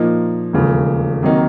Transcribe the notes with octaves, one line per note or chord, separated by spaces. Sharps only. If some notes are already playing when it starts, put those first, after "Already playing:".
Already playing: A#2 F3 A#3 D#4
E1 D#2 C#3 F3 A3
C3 D#3 F#3 A#3 D#4